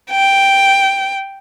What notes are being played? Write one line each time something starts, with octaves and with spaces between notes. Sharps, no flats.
G5